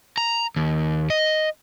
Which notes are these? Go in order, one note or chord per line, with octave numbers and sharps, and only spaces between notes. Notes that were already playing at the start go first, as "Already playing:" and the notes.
A#5
D#2
D#5